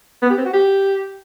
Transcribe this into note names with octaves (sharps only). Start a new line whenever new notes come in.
B3
G4
C4
F#4
G4